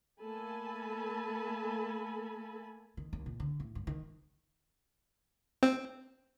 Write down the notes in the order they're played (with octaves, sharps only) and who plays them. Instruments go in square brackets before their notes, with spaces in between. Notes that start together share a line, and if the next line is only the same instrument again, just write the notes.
[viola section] A3 A#3 A4 G#5 A5 B5
[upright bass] D#3
D#2
A#2
D3
A2
G2
D#3
[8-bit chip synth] C4